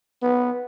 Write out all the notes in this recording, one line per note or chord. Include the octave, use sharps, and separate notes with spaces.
B3